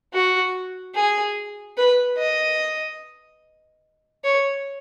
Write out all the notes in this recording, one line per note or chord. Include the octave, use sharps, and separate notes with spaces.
F#4
G#4
B4
D#5
C#5